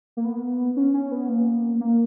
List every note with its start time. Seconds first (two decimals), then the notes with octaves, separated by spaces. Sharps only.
0.17 A#3
0.25 B3
0.76 C#4
0.94 C#4
1.11 B3
1.29 A#3
1.80 A#3